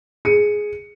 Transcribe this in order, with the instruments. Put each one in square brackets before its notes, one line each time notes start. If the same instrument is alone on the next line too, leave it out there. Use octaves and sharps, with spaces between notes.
[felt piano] G#4 C#7 D#7